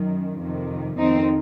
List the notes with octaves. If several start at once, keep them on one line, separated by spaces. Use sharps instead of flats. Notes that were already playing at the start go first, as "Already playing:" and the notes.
Already playing: F#2 D#3
F2 C3 D#3
F2 D#3 C4 D#4